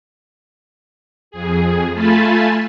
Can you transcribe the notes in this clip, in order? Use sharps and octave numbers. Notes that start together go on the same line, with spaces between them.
F2 G#4
A3 F4 G#5 A5 B5 A6